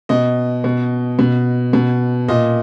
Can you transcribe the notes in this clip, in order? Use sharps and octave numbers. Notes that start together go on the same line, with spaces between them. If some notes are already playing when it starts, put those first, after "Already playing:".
B2 D#5
B2
B2
B2
A#2 D#5